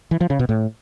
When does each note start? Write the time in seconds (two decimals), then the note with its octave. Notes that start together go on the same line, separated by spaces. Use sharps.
0.11 E3
0.21 F3
0.30 C#3
0.39 B2
0.49 A2